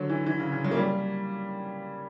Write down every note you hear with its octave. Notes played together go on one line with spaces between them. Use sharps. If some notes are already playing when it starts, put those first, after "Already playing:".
Already playing: D3 F#3
E3
E3
C#3
C#3
F#3
A#3
G3